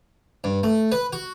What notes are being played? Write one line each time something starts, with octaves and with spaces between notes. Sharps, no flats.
G2
A3
B4
F#4